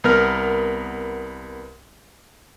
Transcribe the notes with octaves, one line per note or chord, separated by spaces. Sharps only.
C2 B3 A#4 F6